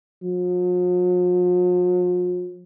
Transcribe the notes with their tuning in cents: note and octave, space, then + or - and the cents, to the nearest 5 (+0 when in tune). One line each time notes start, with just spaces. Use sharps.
F3 +45